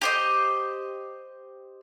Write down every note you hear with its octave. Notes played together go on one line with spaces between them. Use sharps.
G4 C5 D#5